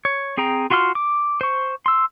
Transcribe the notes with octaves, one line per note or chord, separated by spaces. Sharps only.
C#5
C4 G#4 G5 A#5
F4 F#4 F5 C6 F6
D6
C5 C#6
C6 E6